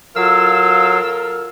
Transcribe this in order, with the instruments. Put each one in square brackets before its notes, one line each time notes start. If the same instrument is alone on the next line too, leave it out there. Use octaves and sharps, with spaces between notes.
[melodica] F#3 F5 [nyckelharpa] F4 [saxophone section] A4 A#4 [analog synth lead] E6